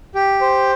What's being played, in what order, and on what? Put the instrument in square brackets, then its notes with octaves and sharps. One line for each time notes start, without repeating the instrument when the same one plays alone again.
[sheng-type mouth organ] G4
C5